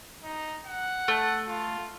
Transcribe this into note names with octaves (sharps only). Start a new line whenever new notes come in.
D#4
F#5
A3
F4